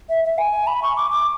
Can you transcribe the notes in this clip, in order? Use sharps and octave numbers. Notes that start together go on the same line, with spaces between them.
E5
E5
G#5
B5
C#6
D6
D6